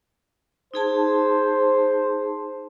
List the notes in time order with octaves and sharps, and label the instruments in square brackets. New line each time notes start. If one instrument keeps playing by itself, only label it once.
[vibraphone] D#4 G#4 A5 [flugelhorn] C5